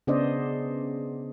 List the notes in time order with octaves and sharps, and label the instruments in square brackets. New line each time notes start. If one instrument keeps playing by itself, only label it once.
[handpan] C#3 B3 D4 C5 D5 D#5